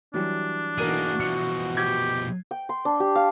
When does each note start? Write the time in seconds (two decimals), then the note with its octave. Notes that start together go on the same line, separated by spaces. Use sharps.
0.14 E3 F#3 G3 D4
0.78 B1 E3 A#3 F#4 G#4 A#4 D#7
1.20 B2 F3 C#7
1.77 G4 G#6
2.51 G5
2.69 C6
2.85 D4
3.00 G4
3.15 F5